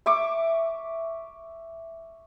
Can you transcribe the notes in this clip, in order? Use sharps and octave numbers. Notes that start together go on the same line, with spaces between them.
E5 C#6 D6